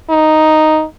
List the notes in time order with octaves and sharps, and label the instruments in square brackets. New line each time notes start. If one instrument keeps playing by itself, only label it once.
[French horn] D#4